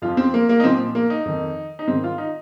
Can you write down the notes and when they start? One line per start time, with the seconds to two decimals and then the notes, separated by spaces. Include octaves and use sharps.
0.02 F2 F3 F4
0.17 C4
0.34 A#3
0.49 A#3
0.60 D#4
0.64 A#2 F3 C4
0.95 A#3
1.10 D#4
1.25 F2 D#3
1.79 D#4
1.87 G#2 D#3 C4
2.04 F4
2.18 D#4